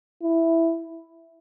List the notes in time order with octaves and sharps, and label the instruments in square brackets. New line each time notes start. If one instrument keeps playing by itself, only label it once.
[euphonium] E4